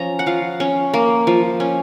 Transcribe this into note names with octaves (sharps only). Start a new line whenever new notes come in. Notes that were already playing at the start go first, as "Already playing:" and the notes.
Already playing: F3 C#4 A#5
F#5
F3 F5
C#4
A#3
F3
C#4